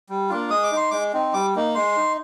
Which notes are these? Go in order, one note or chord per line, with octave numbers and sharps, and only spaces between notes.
G3
A#3 D4 F4
G#3 D#6
D6
D#4 C6
G#3 D6
C4 D#4
G3 D6
A#3 D#4
G#3 C6
D#4